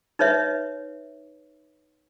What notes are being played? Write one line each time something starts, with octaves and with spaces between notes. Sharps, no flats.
D#4 B4 C#5 E5